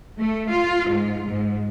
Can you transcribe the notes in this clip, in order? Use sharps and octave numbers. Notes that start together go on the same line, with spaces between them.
A3
F4
G#2
G#2